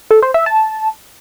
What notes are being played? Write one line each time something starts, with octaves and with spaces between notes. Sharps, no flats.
A4
C5
E5
A5